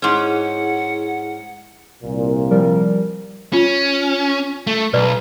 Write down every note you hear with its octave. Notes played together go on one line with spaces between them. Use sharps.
G#2 C#4 E4 G#4 F#5
C2 A#2
F3 G3 A#4
C#4 F4
A3
B1 B4 D5